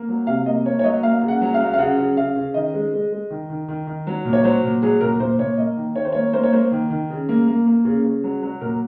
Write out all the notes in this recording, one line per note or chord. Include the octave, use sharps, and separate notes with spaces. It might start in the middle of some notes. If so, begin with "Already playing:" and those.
Already playing: A#3
F#3
C3 F5
A#3 D#5
A#3 C#5
C#5
F#3 D#5
A#3 F5
C#3
F#5
F#3
F5
F#3
F5
C#3 F#5
C#3
C#3 F5
C#3
D#3 D#5
G#3
G#3
G#3
D#3
D#3
D#3
D#3
F#3
A#2
C#5
F#3 C5
A#2
F#3 G#4
A#2 A#4
A#2 C5
A#2 C#5
A#3 D#5
D#3
D#3 C#5
C5
A#3 C#5
A#3 C5
C#5
A#3 C5
D#3
D#3
C#3
A#3
A#3
A#3
C#3
C#3
F#3
F#3
A#2 A#4